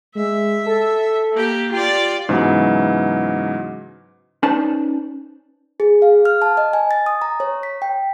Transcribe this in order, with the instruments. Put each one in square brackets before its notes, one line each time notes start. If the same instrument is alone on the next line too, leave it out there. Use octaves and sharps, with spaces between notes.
[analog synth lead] G#3 [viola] E5
[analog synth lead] A4
[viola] A#3 G4
[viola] F4 D5 [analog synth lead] G4
[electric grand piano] G#2 C#3 E3 F#3 B3
[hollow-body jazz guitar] C#4 D#4 B4 C5 D5 A5
[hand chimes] G#4
F5
F6
A5
D#5
G#5
A6
D#6
A#5
C#5
B6
G5